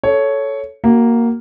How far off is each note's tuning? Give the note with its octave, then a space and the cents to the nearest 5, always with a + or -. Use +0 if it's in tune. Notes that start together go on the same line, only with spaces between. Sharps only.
A4 -10 C#5 +5
A#3 +0 F#4 +20